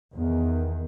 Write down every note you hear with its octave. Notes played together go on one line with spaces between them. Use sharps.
E2 D#3